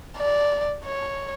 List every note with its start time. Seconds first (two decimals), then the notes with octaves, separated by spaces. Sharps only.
0.17 D5
0.85 C#5